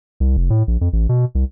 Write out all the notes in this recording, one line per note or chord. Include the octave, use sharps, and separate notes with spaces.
C2
F1
A2
A#1
F2
A1
B2
C2